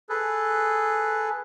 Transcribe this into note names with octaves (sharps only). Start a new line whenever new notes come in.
G#4 A4 B4